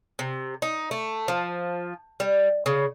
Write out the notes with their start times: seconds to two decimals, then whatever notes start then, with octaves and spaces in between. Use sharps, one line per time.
0.19 C3
0.62 D#4
0.91 A3
1.28 F3
2.20 G3
2.66 C#3